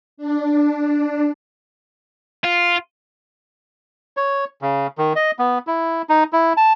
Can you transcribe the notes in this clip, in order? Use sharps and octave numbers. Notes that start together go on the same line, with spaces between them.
D4
F4
C#5
C#3
D#3
D#5
B3
E4
D#4
E4
A5